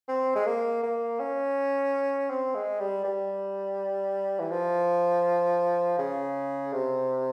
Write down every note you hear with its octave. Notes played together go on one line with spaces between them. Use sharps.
C4
G#3
A#3
A#3
C#4
C4
G#3
G3
G3
E3
F3
C#3
C3